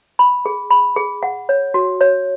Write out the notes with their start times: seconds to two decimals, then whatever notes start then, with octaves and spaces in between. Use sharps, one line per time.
0.19 B5
0.46 G#4
0.70 B5
0.96 G#4
1.23 F#5
1.49 C#5
1.74 F#4
2.01 C#5